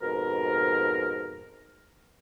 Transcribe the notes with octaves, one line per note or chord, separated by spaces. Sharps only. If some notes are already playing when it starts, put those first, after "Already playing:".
F2 G#2 B2 A#4